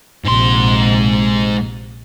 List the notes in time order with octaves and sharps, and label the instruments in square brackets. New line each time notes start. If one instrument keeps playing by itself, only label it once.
[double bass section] A#1 C3 [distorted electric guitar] G#2 C6